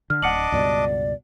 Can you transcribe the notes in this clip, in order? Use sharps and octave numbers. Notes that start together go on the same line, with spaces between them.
D3 F6
D1 D4 D#5 F#5 D6 C#7 F#7
C#2 G2 B2 D5